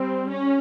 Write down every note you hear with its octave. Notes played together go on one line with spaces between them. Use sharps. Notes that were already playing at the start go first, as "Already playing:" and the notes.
Already playing: G3 C4
C#4